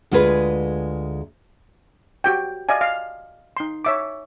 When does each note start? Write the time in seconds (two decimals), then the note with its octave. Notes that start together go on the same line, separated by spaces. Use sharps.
0.11 D2 G#3 F4 G#4 B4
2.24 F#4 G4 G5
2.69 D5 D#5 F5 G#5
2.81 F5
3.57 D#4 C6
3.85 C#5 E5 D6